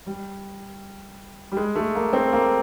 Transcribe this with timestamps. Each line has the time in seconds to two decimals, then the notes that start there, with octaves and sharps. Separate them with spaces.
0.06 G3
1.52 G3
1.57 G#3
1.75 A3
1.95 A#3
2.13 C4
2.32 A#3